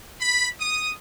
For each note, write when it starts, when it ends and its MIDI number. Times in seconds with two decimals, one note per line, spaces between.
0.20 0.47 83
0.59 0.92 87